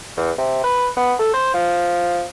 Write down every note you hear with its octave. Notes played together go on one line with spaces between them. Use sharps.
E2
C3
B4
B3
A4
C5
F3